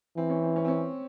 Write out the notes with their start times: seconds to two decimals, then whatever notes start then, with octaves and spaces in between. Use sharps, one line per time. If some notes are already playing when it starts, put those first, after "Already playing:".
0.17 E3 C4
0.30 C#4
0.43 C4
0.56 C#4
0.65 C4
0.68 C#4